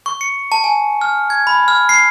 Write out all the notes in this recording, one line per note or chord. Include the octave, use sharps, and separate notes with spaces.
C#6
C#7
A5
G#5
F6
G#6
B5
F6
C7